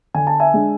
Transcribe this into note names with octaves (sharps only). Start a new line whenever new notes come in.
D3 G#5
A5
E5 G#5
G#3 D4